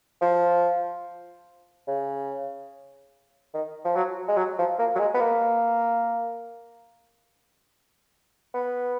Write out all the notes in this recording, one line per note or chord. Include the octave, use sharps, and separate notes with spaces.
F3
C#3
D#3
F3
F#3
G#3
F#3
F3
A#3
F#3
G#3
B3
A#3
B3